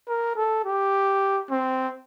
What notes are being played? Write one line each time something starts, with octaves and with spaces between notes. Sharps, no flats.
A#4
A4
G4
C4